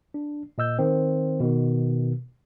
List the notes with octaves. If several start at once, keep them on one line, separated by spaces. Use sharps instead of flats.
D4
A#2 D#5 E6 G6
D#3 C4
B2 D#3